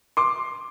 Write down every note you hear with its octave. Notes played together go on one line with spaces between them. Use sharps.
C6 D6